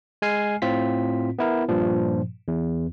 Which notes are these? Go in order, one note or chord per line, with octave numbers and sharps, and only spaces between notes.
G#3 G#5 F6 C7
A2 C4 F4 B6
B3 E4 A#4
G2 A#2 F3
E2